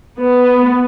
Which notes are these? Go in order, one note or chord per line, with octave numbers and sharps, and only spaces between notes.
B3